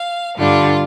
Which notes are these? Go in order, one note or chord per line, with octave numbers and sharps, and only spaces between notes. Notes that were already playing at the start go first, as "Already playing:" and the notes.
Already playing: F5
G2 D3 G3 D4 F4